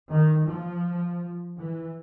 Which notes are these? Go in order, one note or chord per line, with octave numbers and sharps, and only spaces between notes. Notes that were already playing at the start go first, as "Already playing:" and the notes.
D#3
F3
E3